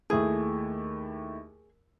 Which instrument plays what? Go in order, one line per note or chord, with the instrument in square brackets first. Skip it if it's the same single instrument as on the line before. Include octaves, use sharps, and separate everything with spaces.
[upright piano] D#2 A3 E4 [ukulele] G#4